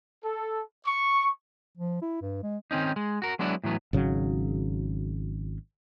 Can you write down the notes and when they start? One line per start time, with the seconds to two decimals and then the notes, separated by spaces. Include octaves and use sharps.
0.24 A4
0.86 C#6
1.77 F3
2.02 E4
2.22 G2
2.43 G#3
2.71 D#3 C4 C#4 D#4
2.96 G#3
3.22 F#4 A#4
3.39 F#3 G#3 B3 D4 E4
3.64 A2 E3 F#3 B3
3.93 G#1 C#3 F#3